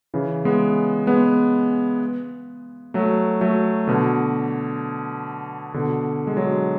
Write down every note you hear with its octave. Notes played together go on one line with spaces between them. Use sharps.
C#3 E3
G#3 B3
G#3 B3
F#3 A3
F#3 A3
B2 D3
B2 D3
G#3
D3 F#3